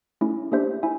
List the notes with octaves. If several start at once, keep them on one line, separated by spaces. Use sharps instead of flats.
A3 C#4 E4
A#3 D4 G4 C5 E5
E4 E5 G#5